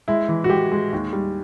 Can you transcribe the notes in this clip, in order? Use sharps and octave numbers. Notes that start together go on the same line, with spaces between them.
G#3 E4
E3
F#4
G#3 G4
G#3
D#2
G3